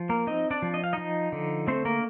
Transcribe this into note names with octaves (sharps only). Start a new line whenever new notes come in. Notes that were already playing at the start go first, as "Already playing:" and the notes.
Already playing: F3
A#3 A#4
C4 D#4 D#5
D4 D5
F3
D#5
F5
F3 D#4 D#5
D3
A3 C4 C5
A#3 A#4